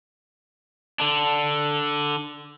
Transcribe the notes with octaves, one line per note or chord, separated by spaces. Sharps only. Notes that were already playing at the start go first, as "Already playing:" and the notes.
D3 D4